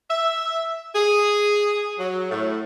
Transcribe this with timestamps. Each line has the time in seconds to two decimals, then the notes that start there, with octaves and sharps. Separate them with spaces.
0.10 E5
0.95 G#4
1.99 F#3
2.31 A2